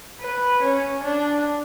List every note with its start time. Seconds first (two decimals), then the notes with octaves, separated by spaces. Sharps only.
0.21 B4
0.62 C#4
1.04 D4